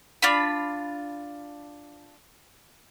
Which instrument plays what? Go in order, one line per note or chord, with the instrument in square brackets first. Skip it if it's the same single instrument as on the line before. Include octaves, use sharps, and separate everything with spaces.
[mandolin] D4 F4 B5